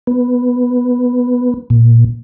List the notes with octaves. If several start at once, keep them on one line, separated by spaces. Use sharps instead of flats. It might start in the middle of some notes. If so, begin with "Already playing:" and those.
B3
A#2